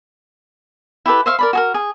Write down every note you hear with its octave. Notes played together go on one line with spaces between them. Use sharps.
E4 G4 A4 B4
C5 E5 F5 C#6
A#4 D5 B5
F#4 G#4 A#4
G#4